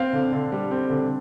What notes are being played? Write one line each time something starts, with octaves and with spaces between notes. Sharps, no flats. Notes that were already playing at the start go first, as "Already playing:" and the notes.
Already playing: C4 F5
D3
D3
G3
C4
D3